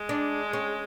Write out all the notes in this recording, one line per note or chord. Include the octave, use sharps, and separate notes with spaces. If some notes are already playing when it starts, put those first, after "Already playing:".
Already playing: G#3
D4
C#4